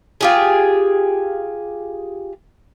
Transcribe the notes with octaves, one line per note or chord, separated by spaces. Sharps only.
F4 G4 G#4